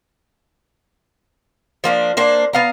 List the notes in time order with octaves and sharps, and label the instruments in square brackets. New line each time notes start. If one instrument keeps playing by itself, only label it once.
[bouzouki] F3 A#3 D4
A#3 D4 C5
B3 F5 A#5